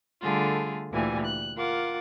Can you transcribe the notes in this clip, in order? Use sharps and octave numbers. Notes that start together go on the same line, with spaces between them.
D3 G3 A3 F4 G#4
D2 A#2 E3 G3 G#5
F#6
F4 A#4 F#5 D6